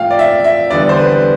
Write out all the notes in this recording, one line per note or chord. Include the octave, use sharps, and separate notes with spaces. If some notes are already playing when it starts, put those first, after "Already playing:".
Already playing: A2 F3 A3 F5 G5
D5
E5
E5
E2 D3 G3 D5
C5
B4